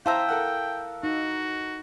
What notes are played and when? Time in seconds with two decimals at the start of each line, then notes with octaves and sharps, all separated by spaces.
0.06 E4 C5 E5 F5 G5 A5 A#5 E6
0.28 A4 A#4 F#5
1.03 D#4 F#4